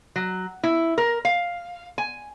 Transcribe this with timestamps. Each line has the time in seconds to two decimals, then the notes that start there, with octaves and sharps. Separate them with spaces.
0.16 F#3
0.63 E4
0.98 A#4
1.25 F5
1.98 G#5